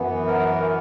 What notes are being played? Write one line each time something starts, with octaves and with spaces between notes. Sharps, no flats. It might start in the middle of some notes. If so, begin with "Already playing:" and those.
Already playing: F#2 E3 B3
A#4